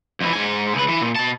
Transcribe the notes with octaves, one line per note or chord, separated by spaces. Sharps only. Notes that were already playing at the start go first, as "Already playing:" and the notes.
F2 E3
G#2 G#5
C#2 B4
E3
A#2
B2 A5